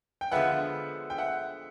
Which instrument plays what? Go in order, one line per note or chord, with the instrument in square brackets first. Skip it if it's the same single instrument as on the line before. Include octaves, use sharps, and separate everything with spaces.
[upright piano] G5
[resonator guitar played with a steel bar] D3 F3 G#3 B3 [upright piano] E5 F#5
[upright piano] G5
E5 F#5